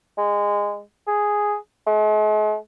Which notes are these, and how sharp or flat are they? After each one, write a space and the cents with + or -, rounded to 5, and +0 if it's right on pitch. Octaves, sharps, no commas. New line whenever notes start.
G#3 -20
G#4 +0
G#3 +45